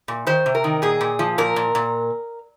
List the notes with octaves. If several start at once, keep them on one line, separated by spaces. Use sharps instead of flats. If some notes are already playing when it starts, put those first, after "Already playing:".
A#2
D#3 C5
C3
A#4
D#3
A#2 G#4
A#2
F3
A#2 A#4
A#2
A#2